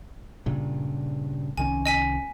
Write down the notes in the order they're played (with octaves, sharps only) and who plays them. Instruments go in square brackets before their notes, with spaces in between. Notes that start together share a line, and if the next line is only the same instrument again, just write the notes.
[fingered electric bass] G2 A#2 C#3
[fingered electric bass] C2 D#3 C#4 [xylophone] G#5
[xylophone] D#5 G#5 B6